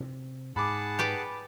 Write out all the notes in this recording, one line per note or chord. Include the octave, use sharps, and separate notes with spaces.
C3
G#2 G#4 F#5 A5 B5 D6
G4 B4 D5